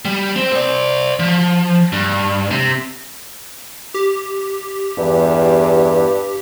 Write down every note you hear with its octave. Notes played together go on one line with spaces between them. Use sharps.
G3
C4
C5 D5
F3
G2
C3
G4
E2 G2